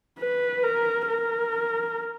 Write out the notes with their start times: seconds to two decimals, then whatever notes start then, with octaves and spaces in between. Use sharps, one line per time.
0.20 B4
0.64 A#4
1.08 A#4